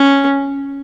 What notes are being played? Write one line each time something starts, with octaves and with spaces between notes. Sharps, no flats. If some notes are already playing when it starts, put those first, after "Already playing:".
Already playing: C#4